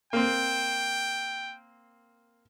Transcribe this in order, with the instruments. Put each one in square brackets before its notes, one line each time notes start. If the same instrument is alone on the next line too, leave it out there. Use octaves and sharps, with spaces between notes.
[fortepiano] A#3 C4 [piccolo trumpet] G5